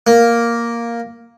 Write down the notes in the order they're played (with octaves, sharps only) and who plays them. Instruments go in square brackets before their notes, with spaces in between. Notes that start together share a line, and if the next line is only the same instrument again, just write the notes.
[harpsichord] A#3